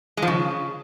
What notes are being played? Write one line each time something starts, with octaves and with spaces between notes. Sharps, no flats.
G#3
F3
C#3